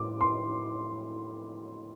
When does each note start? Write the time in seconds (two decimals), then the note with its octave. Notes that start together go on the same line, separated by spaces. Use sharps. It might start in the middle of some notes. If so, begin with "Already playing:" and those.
Already playing: A2 D6
0.21 C6